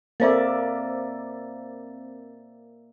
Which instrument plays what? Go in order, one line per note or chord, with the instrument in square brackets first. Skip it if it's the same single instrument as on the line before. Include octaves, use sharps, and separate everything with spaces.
[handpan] A#3 D5 E5 [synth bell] C4 C5 A6